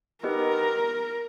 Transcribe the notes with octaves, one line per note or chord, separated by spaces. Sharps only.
B3 D#4 G4 A#4 B4 D#5